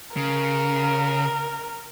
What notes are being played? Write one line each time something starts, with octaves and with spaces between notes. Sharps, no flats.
C#3 A#4